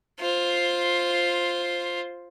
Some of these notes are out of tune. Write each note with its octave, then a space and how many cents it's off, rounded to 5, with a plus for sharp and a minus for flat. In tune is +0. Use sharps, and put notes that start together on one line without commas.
F4 +0 C5 +5